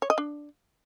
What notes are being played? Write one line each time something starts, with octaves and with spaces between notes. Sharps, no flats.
C#5
D#5
D4